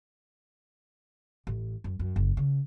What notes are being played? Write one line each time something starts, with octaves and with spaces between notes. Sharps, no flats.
A1
F#2
F#2
F#1
C#3